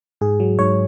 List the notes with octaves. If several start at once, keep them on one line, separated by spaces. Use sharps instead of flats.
G#2 G#4
F#3
G#2 C#5